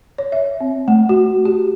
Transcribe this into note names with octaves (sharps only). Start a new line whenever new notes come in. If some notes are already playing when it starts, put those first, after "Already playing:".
C#5
E5
C4
A3
F#4
G4